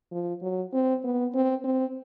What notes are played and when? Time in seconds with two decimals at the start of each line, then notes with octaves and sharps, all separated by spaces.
0.12 F3
0.42 F#3
0.73 C4
1.04 B3
1.34 C4
1.64 C4